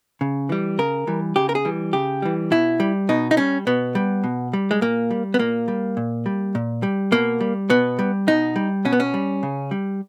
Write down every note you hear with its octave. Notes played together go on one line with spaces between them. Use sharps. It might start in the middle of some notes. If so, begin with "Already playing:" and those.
C#3
E3 G3
C#3 A#4
E3 G3
C#3 G4
A#4
G#4
E3 G3
C#3 G4
E3 G3
B2 E4
G3
B2 D#4
D#4
G3 C#4
B2 B3
G3
B2
G3
G#3
A#2 A#3
G3
B3
A#2 A#3
G3
A#2
G3
A#2
G3
B2 A#3
G3
B2 B3
G3
B2 D#4
G3
B2 C#4
B3
C#4
G3
C#3
G3